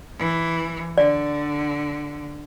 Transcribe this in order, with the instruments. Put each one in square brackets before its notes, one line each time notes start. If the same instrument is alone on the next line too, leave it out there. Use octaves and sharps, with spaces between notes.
[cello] E3
[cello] D3 [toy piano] D5